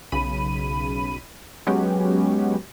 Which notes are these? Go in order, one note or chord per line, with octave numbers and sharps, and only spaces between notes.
B1 C#3 B5 D#7
F#3 G#3 B3 C#4 F#4 G4